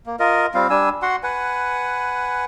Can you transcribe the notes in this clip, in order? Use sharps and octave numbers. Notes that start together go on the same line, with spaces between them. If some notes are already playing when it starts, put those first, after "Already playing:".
A#3
F4 A#4 D#5
G3 C4 F4 F5
G3 D4 G#5 E6
F#4 F#5 C6
B4 F#5 G#5